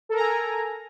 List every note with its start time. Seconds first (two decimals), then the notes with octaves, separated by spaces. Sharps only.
0.09 A4
0.12 A#4
0.16 A#5
0.19 G#5